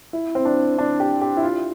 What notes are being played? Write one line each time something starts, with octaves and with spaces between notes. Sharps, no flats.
E4
C4
D4
D4
G4
G4
E4
F4